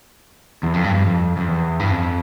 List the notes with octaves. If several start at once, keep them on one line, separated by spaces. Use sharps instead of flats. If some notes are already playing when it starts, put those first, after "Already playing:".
E2
F2
G2
G2
F2
F2
E2
G2
F2